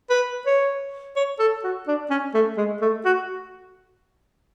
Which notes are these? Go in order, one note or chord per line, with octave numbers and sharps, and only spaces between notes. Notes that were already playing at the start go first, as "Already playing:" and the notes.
B4
C#5
C#5
A4
F#4
D4
C#4
A3
G#3
A3
F#4